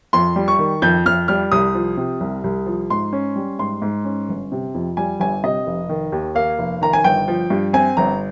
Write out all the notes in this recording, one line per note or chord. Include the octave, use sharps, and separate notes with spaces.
F2 C6
G3
C#6
D#3
F2 G6
F2 F6
G3 F6
C2 D#6
F3
C3
C2
C2
F3
G#2 C6
C#4
G3
G#2 C6
G#2
C#4
G1
C3
F2
G3 G#5
G1 G#5
C3 D#5
F1
D#3
D#2
A#3 F5
F1
D#3 A#5
G#5
G1 G5
F3
G2
C4 G#5
G1 A#5